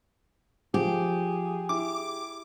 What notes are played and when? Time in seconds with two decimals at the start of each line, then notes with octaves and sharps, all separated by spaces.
0.74 F3 G4 G#4
1.69 E4 D6